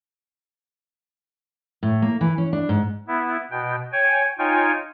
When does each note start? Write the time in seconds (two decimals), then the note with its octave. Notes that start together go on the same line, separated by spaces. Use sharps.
1.83 A2
2.02 A#3
2.21 E3
2.38 C#4
2.53 D4
2.69 G#2
3.08 B3 E4
3.51 B2 G5
3.92 C#5 G5 G#5
4.39 D#4 F4 C#5 G5 G#5